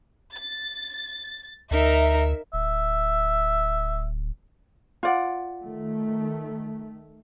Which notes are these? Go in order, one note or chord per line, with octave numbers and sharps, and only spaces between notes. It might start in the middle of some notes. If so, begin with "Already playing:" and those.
A6
D2 D#4 A#4 E5
D1 E5
F4 D5 F#5
D#3 A3